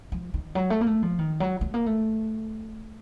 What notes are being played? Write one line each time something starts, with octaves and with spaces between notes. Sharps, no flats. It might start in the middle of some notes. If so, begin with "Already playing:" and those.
F3
D#3
F#3
A3
A#3
A3
F3
D#3
F#3
A3
A#3
A3